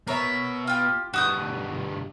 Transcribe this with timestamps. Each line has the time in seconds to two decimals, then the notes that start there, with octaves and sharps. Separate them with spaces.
0.07 B2 A#4 C#5 E5
0.67 F4 G4
1.14 G2 B2 F#4 D#6 G6